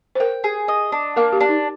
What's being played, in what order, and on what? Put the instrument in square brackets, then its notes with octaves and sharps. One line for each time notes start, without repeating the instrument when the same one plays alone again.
[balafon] C5
[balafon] A#4 [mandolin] G5
[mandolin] G#4
D#5
D4
[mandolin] A#3 [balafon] A#4
[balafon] G4
[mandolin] D4
[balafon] D#4